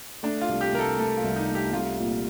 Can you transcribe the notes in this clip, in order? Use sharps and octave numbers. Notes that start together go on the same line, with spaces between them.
A3 D4
F4
C2
G4
C2 A#4
A4
A3 A4
F4
C2
D#4
A3
G4
C2 F4
A#2